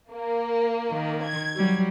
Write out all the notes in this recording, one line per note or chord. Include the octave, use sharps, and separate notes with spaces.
A#3
D#3
G#6
F#3 G3